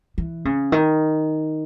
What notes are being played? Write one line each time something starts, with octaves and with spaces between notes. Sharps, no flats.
E3
C#3
D#3